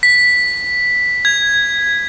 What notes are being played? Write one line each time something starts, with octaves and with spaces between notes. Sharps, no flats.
B6
G#6